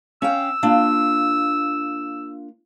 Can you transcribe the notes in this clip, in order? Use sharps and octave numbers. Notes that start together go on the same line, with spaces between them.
C#4 F5 G5 E6
A#3 D4 F4